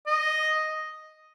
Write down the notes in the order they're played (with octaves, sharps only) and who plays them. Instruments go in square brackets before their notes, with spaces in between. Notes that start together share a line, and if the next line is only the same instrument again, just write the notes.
[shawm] D#5